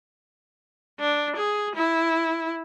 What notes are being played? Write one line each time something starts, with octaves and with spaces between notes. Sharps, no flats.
D4
G#4
E4